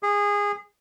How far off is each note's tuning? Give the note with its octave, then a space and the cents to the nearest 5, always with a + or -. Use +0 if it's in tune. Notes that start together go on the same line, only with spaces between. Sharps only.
G#4 -20